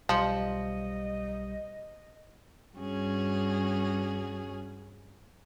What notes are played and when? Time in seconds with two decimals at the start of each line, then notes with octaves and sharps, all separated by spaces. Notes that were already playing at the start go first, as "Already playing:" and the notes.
0.09 B1 F3 G3 D#5 C#7
2.75 G2 G3 C#4 F#4 G#4